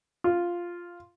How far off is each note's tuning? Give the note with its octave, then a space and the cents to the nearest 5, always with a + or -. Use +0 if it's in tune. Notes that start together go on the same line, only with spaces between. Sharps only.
F4 +0